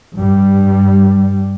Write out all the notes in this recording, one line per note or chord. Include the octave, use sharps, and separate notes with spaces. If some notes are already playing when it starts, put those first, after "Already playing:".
G2 G3